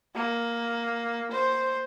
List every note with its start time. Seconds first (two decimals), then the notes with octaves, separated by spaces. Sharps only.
0.15 A#3
1.31 C5